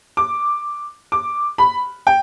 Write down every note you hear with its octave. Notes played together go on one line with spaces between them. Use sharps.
D6
D6
B5
G5